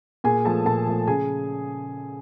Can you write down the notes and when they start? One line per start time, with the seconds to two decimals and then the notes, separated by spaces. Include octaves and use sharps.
0.24 A#2 G#4 G#5
0.45 F3 A3 A4 A5
0.65 A#2 A4 A5
0.86 F3 A3
1.07 C#3 G#4 G#5